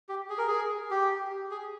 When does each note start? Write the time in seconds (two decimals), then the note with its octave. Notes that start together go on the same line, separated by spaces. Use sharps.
0.09 G4
0.30 G#4
0.38 A#4
0.47 G#4
0.91 G4
1.51 G#4